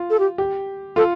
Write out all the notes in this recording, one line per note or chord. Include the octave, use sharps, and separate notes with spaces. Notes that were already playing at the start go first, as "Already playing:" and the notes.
Already playing: F4
A4
G4
G4
F4 A4